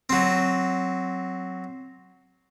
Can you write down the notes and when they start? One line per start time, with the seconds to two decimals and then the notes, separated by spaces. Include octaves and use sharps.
0.10 F#3 C4